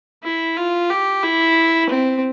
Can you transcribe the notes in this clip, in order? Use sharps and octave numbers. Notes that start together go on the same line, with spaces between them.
E4
F4
G4
E4
C4